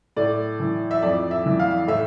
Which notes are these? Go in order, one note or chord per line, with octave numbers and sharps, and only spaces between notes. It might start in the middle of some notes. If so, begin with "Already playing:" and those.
A2 D5
E3
E5
F2 D5
E5
E3
F5
A2 E5